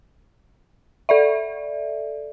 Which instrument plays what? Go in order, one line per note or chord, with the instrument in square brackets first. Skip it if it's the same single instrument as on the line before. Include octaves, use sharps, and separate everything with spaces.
[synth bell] A4 D5 E5